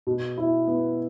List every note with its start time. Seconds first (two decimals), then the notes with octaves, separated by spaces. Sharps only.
0.07 B2
0.38 E4
0.67 B3